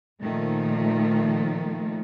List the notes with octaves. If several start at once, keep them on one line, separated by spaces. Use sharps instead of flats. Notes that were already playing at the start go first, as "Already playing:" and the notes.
A#2 D#3 F3 A3